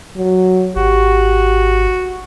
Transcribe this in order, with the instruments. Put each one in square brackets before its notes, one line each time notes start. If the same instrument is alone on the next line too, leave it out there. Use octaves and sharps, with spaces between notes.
[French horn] F#3
[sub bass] G#1 [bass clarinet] F#4 [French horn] G4